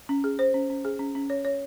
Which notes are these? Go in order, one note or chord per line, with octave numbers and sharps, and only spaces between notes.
C#4
G#4
C5
C#4
C#4
G#4
C#4
C#4
C#5
C#5